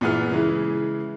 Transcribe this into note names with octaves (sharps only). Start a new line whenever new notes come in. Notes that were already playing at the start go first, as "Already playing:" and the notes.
A#2 E3 B3 G#4 F6
C#3 E3 G#3